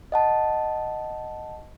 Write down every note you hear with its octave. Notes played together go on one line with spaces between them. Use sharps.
D#5 F#5 A5